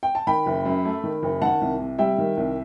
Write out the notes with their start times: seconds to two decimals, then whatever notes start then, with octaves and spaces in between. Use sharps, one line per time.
0.03 G5
0.15 A5
0.27 D#3 G5 B5
0.46 F#1
0.66 F#2
0.85 A3
1.04 D#3
1.23 F#1
1.42 D#3 F#5 A5
1.61 C2
1.80 C3
1.98 G3 E5 G5
2.18 D#3
2.37 C2